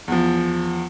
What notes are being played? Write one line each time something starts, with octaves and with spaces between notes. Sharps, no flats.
E2 F3